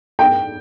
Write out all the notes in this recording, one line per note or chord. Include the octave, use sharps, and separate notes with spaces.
G5